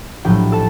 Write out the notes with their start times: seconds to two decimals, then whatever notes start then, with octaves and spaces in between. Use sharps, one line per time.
0.25 A#1 A2 F#3 G4 G5
0.52 A4 A5